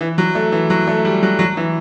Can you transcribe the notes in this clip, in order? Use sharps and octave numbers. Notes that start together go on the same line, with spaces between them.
E3
F#3
A3
E3
F#3
A3
G3
F#3
F#3
E3